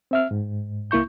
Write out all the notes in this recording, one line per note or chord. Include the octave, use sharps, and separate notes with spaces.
C4 E5 F6
G#2
C#2 A#3 E4 C#6 G6